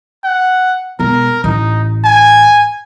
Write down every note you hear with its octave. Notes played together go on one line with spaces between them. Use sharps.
F#5
E1 A#4
A1 D#4
G#5